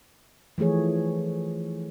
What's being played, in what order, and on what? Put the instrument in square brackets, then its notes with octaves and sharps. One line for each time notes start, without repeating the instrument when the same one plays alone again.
[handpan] E3 F3 A3 G#4 C#5